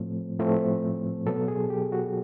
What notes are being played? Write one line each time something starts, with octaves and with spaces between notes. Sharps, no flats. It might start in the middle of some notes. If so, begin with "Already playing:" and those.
Already playing: A2 F3 A3 C4
A2 F3 A3 C4
B2 F#3 B3 A4
G#4
G4
F#4